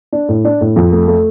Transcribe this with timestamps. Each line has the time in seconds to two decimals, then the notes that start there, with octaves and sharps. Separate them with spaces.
0.13 D4
0.28 A2
0.45 D4
0.61 A2
0.76 F2
0.92 A3
1.08 A3